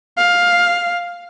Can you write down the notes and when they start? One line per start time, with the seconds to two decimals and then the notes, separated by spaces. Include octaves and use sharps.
0.18 F5